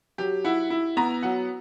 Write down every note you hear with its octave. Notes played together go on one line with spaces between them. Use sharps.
F#3 G4
E4 F#5
E4
B3 A#5
F#3 F#5